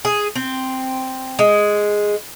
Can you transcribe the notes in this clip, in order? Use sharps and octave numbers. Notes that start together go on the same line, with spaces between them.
G#4
C4
G#3